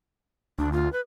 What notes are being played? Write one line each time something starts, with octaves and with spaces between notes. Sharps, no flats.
D2 D4
F4
B4